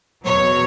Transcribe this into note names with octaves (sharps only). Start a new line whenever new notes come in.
E2 B2 F#3 C#5